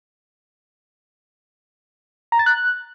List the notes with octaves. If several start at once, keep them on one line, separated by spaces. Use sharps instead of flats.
A#5
A6
F#6